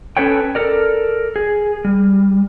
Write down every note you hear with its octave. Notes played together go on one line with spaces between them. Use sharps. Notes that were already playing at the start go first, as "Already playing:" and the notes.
C#4 A4 B4 C#5 G5
A4 A#4 D5
G#4
G3